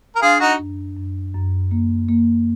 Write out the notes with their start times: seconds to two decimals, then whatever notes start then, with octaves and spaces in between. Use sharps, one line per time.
0.16 A#4
0.22 D4 F4 G#4
0.40 D#4 F#4
0.59 F#2
0.97 F#2
1.34 F#2
1.71 A#3
2.09 A#3